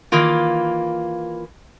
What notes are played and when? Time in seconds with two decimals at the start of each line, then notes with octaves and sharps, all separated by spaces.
0.12 D#3 E3 A#3 F4